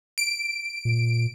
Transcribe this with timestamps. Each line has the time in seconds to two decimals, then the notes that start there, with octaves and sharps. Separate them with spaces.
0.18 D7
0.85 A#2